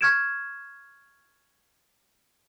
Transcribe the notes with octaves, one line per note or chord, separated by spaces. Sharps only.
C#6 F6 G#6 D7 E7